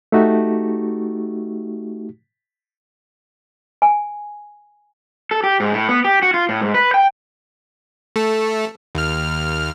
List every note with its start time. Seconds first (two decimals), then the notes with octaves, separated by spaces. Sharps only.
0.12 A3 D#4 F#4 G4
3.82 G#5
5.31 A4
5.44 G4
5.60 G#2
5.72 A2
5.89 B3
6.04 G4
6.23 F#4
6.34 F4
6.49 A2
6.61 G#2
6.74 B4
6.94 G5
8.16 A3 A4
8.95 D#2 F6